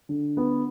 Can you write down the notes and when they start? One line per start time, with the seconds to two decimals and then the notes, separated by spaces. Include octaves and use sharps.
0.09 D3
0.37 B3